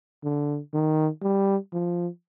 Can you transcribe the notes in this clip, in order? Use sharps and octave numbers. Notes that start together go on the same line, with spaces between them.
D3
D#3
G3
F3